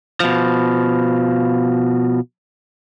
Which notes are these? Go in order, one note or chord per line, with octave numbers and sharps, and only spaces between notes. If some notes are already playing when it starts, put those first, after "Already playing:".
B2 F3